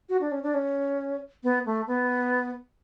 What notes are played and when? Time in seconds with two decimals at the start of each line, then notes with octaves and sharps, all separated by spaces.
0.09 F#4
0.21 D4
0.32 C#4
0.43 D4
0.54 C#4
1.44 B3
1.66 A3
1.87 B3